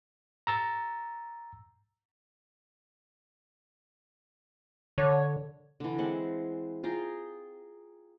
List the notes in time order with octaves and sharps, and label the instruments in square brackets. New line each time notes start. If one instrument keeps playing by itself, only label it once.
[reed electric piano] A#5 E6 A6
[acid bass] D3 [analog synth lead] C#5
[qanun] D3 E3
G#3 C4 F#5
F4 G#4 G5 A#5